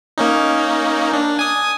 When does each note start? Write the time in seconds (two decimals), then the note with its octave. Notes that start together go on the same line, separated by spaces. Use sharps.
0.18 A#3 C#4 D#4
1.13 D4
1.39 G#5 D#6